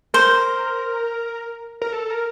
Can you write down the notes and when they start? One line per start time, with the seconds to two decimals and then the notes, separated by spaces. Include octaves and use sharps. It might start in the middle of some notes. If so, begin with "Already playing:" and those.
0.14 A#4 C5
1.82 A#4
1.93 A4
2.10 A#4